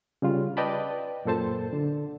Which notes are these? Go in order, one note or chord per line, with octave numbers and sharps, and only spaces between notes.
C#3 G3 F4
B4 D5 D#5 G5 A5 B5
F#2 A#2 A4 C5 A5
D3